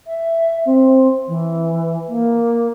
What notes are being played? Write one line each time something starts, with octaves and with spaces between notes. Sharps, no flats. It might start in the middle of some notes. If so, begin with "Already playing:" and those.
E5
C4
E3
A#3